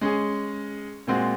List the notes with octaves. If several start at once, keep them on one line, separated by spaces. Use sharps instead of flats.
G#3 C#4 G#4
A#2 G#3 C4 F#4